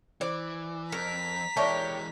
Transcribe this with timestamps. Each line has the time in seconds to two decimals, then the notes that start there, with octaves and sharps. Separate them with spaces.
0.21 E3 C5 D5
0.92 F2 A#4 A#5 B6
1.57 E3 G#3 G4 A#4 C#5 D5 E5 A5